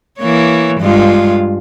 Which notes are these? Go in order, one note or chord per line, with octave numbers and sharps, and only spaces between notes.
E3 A#3 C#5
G2 G#3 F4